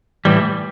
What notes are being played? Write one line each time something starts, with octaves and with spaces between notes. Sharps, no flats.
A2 E3 G3